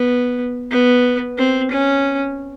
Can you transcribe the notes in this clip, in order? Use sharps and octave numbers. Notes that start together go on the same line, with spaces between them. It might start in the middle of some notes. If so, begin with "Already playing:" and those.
Already playing: B3
B3
C4
C#4